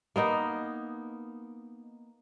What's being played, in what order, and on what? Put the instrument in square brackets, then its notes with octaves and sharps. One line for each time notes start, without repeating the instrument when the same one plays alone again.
[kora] A#3 B3 D#4